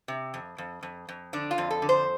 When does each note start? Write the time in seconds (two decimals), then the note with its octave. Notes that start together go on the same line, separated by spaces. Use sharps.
0.08 C3
0.34 F2
0.58 F2
0.83 F2
1.09 F2
1.33 D3 D4
1.51 F4
1.58 F2
1.70 A4
1.82 D3
1.89 C5